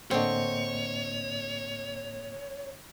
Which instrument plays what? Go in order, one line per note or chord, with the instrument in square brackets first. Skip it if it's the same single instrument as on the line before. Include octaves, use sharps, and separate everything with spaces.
[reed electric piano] A2 A#3 D#5 [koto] D3 C4 [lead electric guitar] C#5